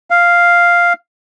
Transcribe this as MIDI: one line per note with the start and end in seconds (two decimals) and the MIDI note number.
0.10 0.93 77